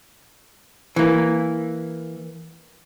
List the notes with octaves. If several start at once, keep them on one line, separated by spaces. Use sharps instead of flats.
E3 A#3